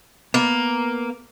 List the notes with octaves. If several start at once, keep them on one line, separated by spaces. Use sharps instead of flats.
A#3 B3